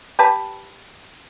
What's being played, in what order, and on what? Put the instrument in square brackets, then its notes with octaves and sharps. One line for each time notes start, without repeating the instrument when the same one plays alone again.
[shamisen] G4 B4 A5